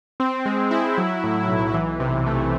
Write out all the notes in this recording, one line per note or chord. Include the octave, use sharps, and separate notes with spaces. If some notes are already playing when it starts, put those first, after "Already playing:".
C4
G#3
E4
F#3
A2
B1
E3
C3
A3